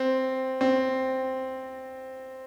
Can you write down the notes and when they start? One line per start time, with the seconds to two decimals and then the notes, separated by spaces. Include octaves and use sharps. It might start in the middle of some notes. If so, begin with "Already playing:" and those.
Already playing: C4
0.61 C4